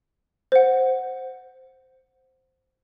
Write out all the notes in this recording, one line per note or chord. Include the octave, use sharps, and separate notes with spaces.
C5 F#5